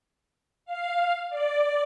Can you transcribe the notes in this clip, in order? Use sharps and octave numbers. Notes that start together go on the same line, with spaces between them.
F5
D5